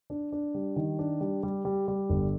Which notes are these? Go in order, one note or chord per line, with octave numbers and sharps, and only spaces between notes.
D4
D4
G3
D#3
D4
G3
G3
G3
G3
G1